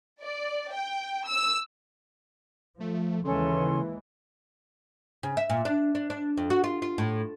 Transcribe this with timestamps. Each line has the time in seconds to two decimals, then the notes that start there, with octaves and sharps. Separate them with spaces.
0.23 D5
0.73 G5
1.28 E6
2.80 F3 A3
3.25 D#2 C#3 E3 G#3 C#4 A4 C6
5.23 C#3
5.37 E5
5.50 A#2
5.65 D4
5.95 D4
6.10 D4
6.37 F2
6.50 F#4
6.64 F4
6.82 F4
6.98 A2